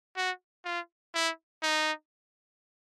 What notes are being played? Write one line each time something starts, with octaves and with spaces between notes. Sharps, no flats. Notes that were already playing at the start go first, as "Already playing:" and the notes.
F#4
F4
E4
D#4